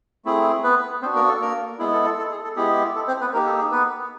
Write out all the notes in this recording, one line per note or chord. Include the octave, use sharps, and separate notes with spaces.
A3 C4 E4 G#4
B3 B4
B3 C4 D4 F#4 C5
A#3 A#4
A4
A#3 A#4
G#3 B3 E4 G#4
A4
A4
A4
G#4
A4
G#3 B3 E4 G4 G#4
A4
C4 C5
B3 B4
A#3 D#4 G4 A#4
A4
G#4
B3 B4